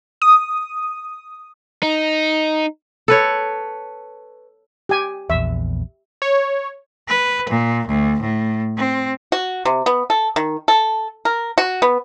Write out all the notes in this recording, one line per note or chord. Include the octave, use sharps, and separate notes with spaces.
D#6
D#4
A4 B4 C#5
G4 G#5
A#1 E2 E5
C#5
B4
A#2
D2
A2
C4
F#4
C3
B3
A4
D#3
A4
A#4
F#4
B3